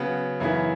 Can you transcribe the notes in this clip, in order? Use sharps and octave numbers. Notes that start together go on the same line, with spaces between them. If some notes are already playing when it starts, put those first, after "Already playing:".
Already playing: C#3 F#3 B3
F#2 C#3 E3 B3 E4